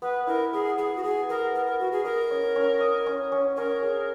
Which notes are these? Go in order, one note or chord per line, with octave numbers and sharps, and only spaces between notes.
B3 B4
E4 A#4
B3 G#4
B3 G#4
F#4
B3 G#4
B3 A#4
B3 A#4
A#4
B3 F#4
G#4
A#4 D#5
C#4
C#4
D#5
C#4
C#4
C#4 A#4
G#4